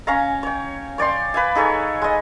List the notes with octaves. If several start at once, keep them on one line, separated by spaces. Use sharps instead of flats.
C#4 C#5 F5 A#5
C#5 G5
C#5 D5 G5 C6
B4 F5 G#5
D#4 G#4 A4 C#5
G#3 D#5